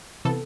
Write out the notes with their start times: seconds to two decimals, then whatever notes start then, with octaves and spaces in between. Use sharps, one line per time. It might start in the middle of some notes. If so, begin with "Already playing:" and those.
0.25 C3 E3 B3 A4